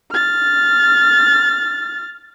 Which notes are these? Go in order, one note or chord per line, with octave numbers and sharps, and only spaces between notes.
F6 A6